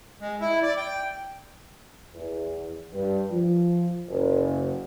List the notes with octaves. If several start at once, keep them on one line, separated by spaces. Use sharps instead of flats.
G#3
E4
D5
G5
E2
G2
F3
F#1